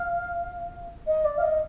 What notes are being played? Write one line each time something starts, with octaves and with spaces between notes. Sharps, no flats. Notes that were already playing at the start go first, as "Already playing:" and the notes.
Already playing: F5
D#5
D5
F5
D#5